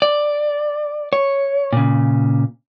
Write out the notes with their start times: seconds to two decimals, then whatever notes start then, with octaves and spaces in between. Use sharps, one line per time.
0.02 D5
1.13 C#5
1.73 A#2 C#3